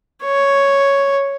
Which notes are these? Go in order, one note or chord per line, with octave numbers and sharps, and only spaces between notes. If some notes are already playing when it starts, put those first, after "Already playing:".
C#5